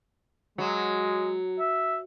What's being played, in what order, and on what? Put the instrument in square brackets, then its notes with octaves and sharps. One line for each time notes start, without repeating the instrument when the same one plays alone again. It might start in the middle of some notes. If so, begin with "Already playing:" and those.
[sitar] F#3 [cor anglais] G#3
[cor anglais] E5